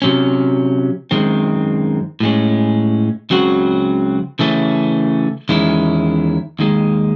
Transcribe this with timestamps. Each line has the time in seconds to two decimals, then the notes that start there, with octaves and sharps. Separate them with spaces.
0.02 C3 F#3 C#4
1.11 F#2 D#3 G#3 C4
2.20 A2 G#3 C#4
3.30 C#2 C#3 F#3 C4 F#4
4.39 C#3 E3 A3 C#4
5.49 E2 D#3 G#3 C#4 E4
6.59 D#2 D#3 G#3